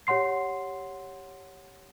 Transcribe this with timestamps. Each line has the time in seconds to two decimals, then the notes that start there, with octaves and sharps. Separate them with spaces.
0.07 G4 C#5 F#5 C6 C7